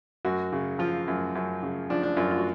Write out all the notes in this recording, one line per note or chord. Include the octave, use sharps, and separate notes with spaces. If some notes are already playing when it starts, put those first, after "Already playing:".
F#2 F#4
C#3
F3 F4
F#2
F#2
C#3
F3 D4
D4
F#2 F4
F4
F#4